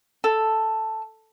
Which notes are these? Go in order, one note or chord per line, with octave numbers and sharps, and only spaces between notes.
A4